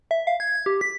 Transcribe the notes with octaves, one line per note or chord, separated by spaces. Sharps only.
E5
F5
G#6
G#6
G4
B6